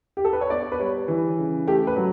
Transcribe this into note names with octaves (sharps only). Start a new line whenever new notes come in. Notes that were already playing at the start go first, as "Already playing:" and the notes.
G4
A4
B4
C#5
B3 D5
B4
G3 C#5
E3
C#3
A3 G4
B4
F#3